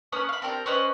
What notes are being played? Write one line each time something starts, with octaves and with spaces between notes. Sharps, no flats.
A#3 C#4 B4 D#6
F5 B5
C4 D4 G4 A#4
C#4 B4 C5 D#5